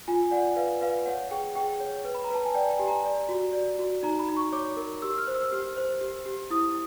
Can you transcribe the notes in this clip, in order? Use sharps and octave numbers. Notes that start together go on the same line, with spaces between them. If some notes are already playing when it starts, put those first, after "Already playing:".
F4 G#5
D5 F#5
B4 F5
B4 F5
C#5 F#5
G#4 G5
G#4 G5
C#5
B4
B5
A#5
B4 A5
G#5
D5 G5
G#5
G4
A#5
D5
F#4
D5
F#4
D#4 A#5
B5
D#4
C#6
C#5 D6
A#4
G4 E6
F6
C5
E6
G4 F6
C5
G4
G4
E4 D#6